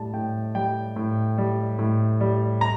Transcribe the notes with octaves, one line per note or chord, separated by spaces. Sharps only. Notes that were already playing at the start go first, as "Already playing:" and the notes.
Already playing: A2 G3 A5
A2 G5
G3 G5
A2
G3
A2
G3
A#5